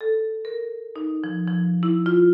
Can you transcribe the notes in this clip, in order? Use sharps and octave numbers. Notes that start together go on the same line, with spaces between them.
A4
A#4
D#4
F3
F3
E4
F4